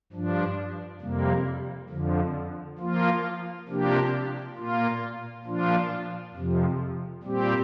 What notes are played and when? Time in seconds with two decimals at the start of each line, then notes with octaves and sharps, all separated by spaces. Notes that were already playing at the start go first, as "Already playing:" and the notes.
0.12 G2 F3 D4
1.01 F2 C3 G3 A#3
1.90 F2 D3 F3
2.78 F3 A#3 F4
3.68 C3 F3 A#3 D4 G4
4.56 A#2 A#3 F4
5.45 A#2 F3 D4 F4
6.34 F2 C3 F3
7.23 A#2 G3 C4 G4